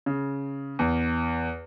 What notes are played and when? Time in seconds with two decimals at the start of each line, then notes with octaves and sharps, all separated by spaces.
0.06 C#3
0.79 E2